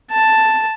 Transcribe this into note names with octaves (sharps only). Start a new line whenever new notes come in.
A5